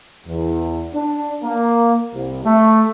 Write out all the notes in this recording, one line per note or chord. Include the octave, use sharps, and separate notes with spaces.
E2
D4
A#3
C2
A3